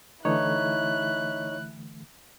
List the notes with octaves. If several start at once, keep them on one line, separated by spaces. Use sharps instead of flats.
D3 E3 A3 D#4 E4 C#5 F#6